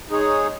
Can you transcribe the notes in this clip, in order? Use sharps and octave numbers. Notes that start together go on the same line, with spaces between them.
G#3 D#4 G#4 C#5